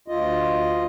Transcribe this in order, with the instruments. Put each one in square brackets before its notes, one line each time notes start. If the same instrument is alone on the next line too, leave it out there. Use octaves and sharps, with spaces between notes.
[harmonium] D2 F4 D#5